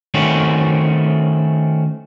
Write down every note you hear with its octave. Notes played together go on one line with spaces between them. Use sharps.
D#3 A3 C4 C#4 F#4